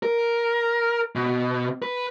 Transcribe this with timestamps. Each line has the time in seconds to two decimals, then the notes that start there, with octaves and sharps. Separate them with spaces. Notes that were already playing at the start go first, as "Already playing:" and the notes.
0.03 A#4
1.15 B2
1.82 B4